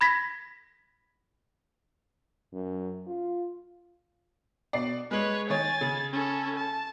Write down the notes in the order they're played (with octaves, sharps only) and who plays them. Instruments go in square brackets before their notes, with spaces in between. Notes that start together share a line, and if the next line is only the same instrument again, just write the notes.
[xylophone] B5 G#6 A#6 B6
[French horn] F#2
F4
[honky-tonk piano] B2 D5 C7
[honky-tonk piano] G#3 F#7 [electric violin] B4 C#5
[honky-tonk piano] D#3 C#5 [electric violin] G#5 A6
[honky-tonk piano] C#3
[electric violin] C#4 A4
A5